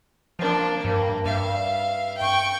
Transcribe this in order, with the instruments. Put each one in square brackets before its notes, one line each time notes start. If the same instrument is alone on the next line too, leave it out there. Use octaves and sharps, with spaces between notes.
[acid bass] F3 [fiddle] A#3 D4
[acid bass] G2 [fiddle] A#3
[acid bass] G2 [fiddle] E5 F5
[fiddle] G5 C#6